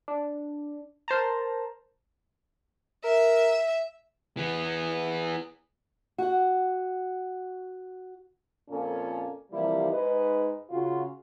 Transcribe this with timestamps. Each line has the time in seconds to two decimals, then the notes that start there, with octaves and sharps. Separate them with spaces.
0.08 D4
1.08 A#4 C5 A5 A#5
3.04 A#4 E5
4.37 E3 B3
6.18 F#4 F#5
8.70 F2 A#2 A#3 C#4 F4 A4
9.52 C3 E3 F3 G3 A#3 E4
9.90 G#2 B4 D#5
10.70 C#3 F4 F#4